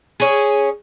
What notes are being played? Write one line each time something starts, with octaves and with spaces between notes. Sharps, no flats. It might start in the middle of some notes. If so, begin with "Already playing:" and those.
C#4 G#4